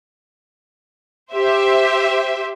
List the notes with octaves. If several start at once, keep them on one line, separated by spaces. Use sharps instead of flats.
G4 C5 E5